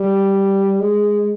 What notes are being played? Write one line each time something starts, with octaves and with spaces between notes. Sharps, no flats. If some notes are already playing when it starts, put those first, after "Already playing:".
Already playing: G3
G#3